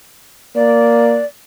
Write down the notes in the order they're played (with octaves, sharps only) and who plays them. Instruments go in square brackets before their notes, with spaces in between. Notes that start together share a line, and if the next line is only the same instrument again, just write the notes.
[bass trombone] A#3 [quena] D5